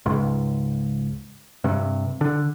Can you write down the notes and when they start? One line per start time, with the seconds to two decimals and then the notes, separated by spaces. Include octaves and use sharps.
0.06 C#2 G#2
1.64 G2 C3
2.21 D3